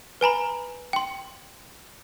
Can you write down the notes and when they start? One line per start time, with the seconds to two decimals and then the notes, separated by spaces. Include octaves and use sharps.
0.21 B4 G#5 A#5 B5
0.93 G5 C6